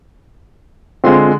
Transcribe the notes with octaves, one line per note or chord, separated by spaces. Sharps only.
D3 G#3 C4 F4 C6